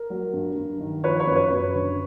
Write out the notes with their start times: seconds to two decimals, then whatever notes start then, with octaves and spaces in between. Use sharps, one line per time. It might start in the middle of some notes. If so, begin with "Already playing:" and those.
Already playing: A#4
0.10 F#3
0.33 G2
0.57 G2
0.80 D#3
1.04 F3 B4 C#5
1.20 B4 C#5
1.27 F#2
1.36 B4 C#5
1.51 F#2
1.74 D3